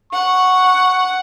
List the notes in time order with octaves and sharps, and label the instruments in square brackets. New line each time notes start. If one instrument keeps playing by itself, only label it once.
[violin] F#5 [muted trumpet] C#6